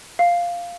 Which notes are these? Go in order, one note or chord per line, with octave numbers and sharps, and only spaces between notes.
F5